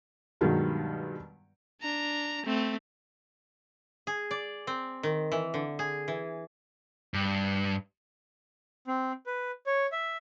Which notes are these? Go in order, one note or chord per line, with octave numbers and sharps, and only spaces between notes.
G2 B2 D#3 F#3 G#3
D4 A#5
A3 C4
G#4
D5
C4
D#3
E3
D3
G#4
E3
G2
C4
B4
C#5
E5